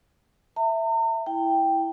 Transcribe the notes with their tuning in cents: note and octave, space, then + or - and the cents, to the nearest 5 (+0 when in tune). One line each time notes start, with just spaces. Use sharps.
E5 +0 A#5 -45
E4 +0 G5 +0